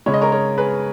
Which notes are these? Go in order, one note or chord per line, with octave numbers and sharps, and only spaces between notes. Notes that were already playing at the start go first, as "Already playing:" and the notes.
C#3 G#3 C#5
D#5
A#4 C#5
A#4 C#5
G#4 B4